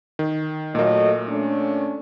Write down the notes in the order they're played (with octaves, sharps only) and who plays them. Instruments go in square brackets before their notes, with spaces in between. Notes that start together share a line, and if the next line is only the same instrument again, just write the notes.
[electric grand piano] D#3
[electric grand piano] A#2 A#3 [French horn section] F#3 A3 D#5
[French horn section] A3 C#4 D4